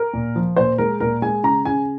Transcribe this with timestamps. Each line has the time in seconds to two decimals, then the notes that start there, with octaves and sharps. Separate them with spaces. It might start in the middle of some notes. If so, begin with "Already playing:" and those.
Already playing: A#4
0.13 A#2
0.36 F3
0.56 A#2 C5
0.78 G#3 A#4
1.00 A#2 A#4
1.22 G#3 G#5
1.43 C#3 A#5
1.65 C#3 G#5